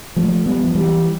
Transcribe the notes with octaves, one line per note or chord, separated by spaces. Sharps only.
F3 A3
G3 B3
F3
E3 G3